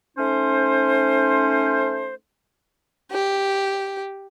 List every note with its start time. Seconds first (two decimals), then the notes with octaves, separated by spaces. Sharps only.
0.17 A3 C#4 D#4 C5
3.12 G4